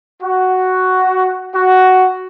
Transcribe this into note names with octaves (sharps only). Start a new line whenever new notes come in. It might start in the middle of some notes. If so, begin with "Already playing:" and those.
F#4
F#4